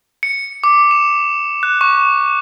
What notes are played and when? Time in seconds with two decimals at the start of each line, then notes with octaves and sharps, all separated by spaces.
0.23 C#7
0.64 D6
0.91 E7
1.63 F#6
1.81 C#6